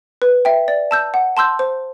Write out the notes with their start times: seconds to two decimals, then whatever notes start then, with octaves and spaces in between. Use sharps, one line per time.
0.22 B4
0.45 E5 G5
0.68 D5
0.91 A5 E6 G6
1.14 F#5
1.37 A5 C6 E6 G6
1.59 C5